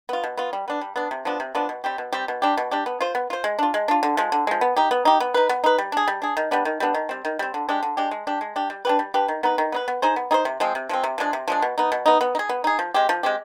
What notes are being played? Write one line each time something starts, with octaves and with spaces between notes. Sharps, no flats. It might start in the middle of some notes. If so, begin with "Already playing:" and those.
B3 F4
B2
B3 F4
G3
B3 D4
G3
B3 D4
C3
F3 B3 D4
C3
F3 B3 D4
B2
G3 C4 G4
B2
G3 C4 G4
B2
G3 D4 G4
B2
G3 D4 G4
B3
F4 C5
B3
F4 C5
G#3
D4 F4
G#3
D4 F4
D3
F3 G#3
D3
F3 G#3
B3
D#4 G4
B3
D#4 G4
B3
D#4 B4
B3
D#4 B4
G3
D4 G#4
G3
D4 G#4
D#3
G3 B3 D4
D#3
G3 B3 D4
D#3
G3 C4
D#3
G3 C4
D3
G#3 D4 G4
D3
G#3 D4 G4
G#3
D4 G4
G#3
D4 G4
G3
D4 G4 B4
G3
D4 G4 B4
D#3
B3 D#4 B4
D#3
B3 D#4 B4
B3
D#4 G#4 C5
B3
D#4 G#4 C5
C3
F3 G#3 C4
C3
F3 G#3 C4
C3
F3 G#3 D4
C3
F3 G#3 D4
B2
B3 D#4
B2
B3 D#4
B3
D#4
G#4
B3
D#4 G#4
F3
G#3 C4 G4
F3
G#3 C4 G4